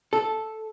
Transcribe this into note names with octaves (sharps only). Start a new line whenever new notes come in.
A4